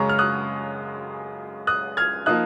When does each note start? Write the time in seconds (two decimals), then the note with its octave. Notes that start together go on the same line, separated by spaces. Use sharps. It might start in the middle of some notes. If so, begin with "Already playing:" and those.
Already playing: F#2 C#3 G#3 A#5 C#6
0.09 F6
0.19 D#6 F#6
1.67 D#6 F#6
1.97 F6 G#6
2.26 F3 A#3 D#4 D#6 F#6